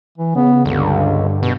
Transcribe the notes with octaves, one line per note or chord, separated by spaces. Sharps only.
E3
C#3 B3
C#2 G2 D3
B2